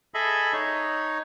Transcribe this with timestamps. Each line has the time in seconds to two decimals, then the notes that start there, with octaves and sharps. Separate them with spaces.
0.14 G#4 A4 D#5 E5 B5
0.53 D#4 C#5